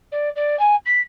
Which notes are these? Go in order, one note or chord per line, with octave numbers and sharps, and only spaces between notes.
D5
D5
G#5
B6